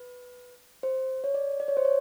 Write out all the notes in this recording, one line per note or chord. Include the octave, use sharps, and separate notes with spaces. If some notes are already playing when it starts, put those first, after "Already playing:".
Already playing: B4
C5
C#5
D5
D5
C#5
C5
C#5